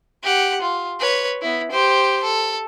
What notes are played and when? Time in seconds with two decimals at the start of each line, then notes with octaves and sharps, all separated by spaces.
0.23 G4 F#5
0.61 F4
1.00 B4 C#5
1.42 B3 E4
1.71 G4 C5
2.23 A4